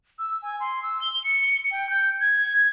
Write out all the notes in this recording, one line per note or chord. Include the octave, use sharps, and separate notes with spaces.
E6
G#5
C6
E6
G7
C#7
G5
G6
G#6